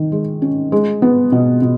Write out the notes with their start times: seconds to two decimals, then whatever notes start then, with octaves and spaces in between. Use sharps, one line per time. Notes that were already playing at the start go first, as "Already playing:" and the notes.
Already playing: D#3
0.12 G#3
0.42 C#4
0.72 G#3
1.02 B3
1.32 B2
1.62 B2